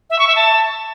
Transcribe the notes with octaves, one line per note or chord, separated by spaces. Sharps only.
E5
C#6
E5
A5